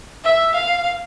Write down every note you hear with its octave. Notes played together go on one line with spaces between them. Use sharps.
E5
F5